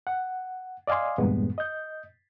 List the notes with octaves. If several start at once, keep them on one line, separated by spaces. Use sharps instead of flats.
F#5
D5 D#5 F5 G#5 C6
E2 G2 A#2 G#3 B3
D#5 G6